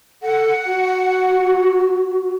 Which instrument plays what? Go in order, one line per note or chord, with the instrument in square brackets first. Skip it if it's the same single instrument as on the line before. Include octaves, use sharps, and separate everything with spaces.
[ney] A4 [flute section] F#5
[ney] F#4